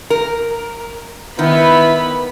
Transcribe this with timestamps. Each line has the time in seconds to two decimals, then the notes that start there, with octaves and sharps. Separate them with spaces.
0.10 A#4
1.39 D#3 B3 E4 B5